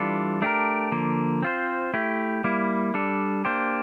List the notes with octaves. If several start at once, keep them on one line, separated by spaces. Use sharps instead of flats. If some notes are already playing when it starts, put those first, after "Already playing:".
Already playing: E3 G3 D4 F4 A4
A3 D4 G4 A#4
D3 F3 A#3
C4 F4 C5
A3 E4 G4
G3 A#3 E4
G3 D4 A4
A#3 D4 G4 C5